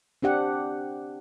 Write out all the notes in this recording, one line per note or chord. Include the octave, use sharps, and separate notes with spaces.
C4 D4 G4 F#5